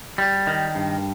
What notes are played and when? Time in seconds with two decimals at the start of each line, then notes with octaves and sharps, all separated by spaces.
0.18 G3
0.47 D#3
0.75 G2